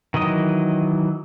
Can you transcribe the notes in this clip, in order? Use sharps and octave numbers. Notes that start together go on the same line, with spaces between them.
D#3 E3 F#3 D#5